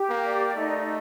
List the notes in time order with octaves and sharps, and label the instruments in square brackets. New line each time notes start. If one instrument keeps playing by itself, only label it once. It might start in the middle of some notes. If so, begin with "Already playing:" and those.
Already playing: [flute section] G4
[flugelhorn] A#3
[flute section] D5
[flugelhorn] A3 [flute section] D#4